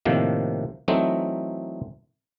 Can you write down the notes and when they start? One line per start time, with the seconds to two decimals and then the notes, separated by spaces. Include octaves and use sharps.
0.05 A2 C3 D#3 F3 A#3
0.88 E3 F#3 A3 C4 D#4